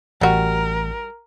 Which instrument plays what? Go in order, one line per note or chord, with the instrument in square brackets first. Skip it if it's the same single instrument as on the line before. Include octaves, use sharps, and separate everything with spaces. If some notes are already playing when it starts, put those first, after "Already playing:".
[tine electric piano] A1 [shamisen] G3 F#4 [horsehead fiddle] A#4